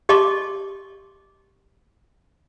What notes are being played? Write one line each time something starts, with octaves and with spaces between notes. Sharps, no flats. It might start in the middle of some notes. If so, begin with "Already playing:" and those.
G4 D#5 A5 C6 D6